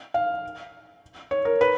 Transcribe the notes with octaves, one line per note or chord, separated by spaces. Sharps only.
F5
C#5
A#4
B4